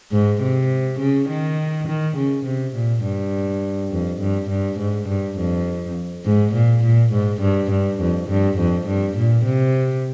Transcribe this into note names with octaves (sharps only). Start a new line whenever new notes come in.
G#2
C3
C#3
D#3
D#3
C#3
C3
A#2
G2
F2
G2
G2
G#2
G2
F2
G#2
A#2
A#2
G#2
G2
G2
F2
G2
F2
G2
A#2
C3